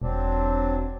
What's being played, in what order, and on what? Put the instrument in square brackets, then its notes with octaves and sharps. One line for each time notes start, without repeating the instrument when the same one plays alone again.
[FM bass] E1 [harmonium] F#3 C4 D4